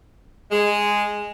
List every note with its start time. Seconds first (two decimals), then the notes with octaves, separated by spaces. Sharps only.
0.52 G#3